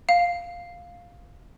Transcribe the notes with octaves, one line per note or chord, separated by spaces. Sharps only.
F5